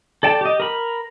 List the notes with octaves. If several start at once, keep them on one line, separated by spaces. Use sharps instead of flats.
A4 D5 G5 A5
G4 D#5
A#4 B5